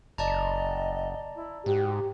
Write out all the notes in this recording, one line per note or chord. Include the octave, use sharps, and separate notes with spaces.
F#1 D5 D#5 A5 A#5
E4
G#2 F#4 G4